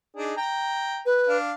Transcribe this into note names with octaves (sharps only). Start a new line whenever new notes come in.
D4 D#4 G#4
G5 A#5
B4
D4 F5